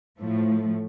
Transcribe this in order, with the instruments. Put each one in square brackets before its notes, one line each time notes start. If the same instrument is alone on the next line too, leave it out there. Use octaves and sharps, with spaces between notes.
[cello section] A2 F3 A3